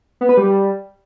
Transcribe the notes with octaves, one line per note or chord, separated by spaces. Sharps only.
B3
B4
G3